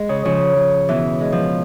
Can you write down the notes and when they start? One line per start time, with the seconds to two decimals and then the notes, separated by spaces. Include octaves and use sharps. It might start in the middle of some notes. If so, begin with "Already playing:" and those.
Already playing: G#3
0.09 C#3
0.25 C#3 F3
0.57 F3
0.89 B2 E3
1.21 G#3
1.32 F3